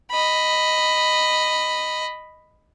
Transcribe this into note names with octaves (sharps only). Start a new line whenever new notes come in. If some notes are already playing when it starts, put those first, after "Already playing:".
D#5 B5